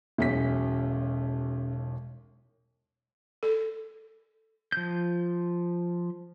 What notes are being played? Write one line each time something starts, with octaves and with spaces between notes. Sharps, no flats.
E1 B1 C#4 G#4 E5 B6
A4
F3 G6